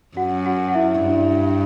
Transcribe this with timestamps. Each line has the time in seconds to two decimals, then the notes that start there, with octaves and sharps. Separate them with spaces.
0.17 F#2 F#4 F#5
0.46 F#4 F#5
0.68 F#5
0.74 E4 E5
1.03 G2